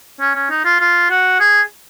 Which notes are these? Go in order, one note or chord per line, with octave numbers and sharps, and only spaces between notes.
C#4
C#4
D#4
F4
F4
F#4
G#4